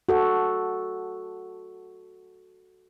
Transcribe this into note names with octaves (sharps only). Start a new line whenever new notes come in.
F#4 A4